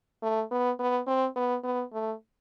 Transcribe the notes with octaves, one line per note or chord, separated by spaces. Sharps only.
A3
B3
B3
C4
B3
B3
A3